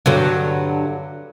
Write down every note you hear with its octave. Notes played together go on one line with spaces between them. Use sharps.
G2 D3 F#3